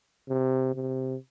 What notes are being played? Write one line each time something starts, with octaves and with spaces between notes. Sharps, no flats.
C3
C3